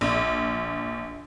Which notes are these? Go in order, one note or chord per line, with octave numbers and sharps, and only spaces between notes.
A#1